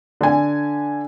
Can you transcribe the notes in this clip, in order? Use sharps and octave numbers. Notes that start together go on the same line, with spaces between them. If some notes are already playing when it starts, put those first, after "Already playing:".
D3 G#5